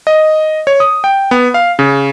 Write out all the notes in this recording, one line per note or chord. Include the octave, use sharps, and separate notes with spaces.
D#5
C#5
D#6
G5
B3
F5
C#3